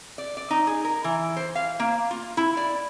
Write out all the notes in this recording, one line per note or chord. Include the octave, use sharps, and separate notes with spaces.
D5
D5
D#4
G#4
A#4
E3
C5
F5
A#3
F4
E4
D5